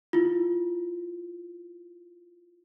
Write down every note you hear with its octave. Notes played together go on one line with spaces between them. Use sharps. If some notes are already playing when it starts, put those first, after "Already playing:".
E4 F4